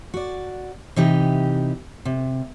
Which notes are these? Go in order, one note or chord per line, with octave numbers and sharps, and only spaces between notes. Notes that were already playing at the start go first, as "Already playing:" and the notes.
F#4 D5
C3 E3 D#4 G4
C3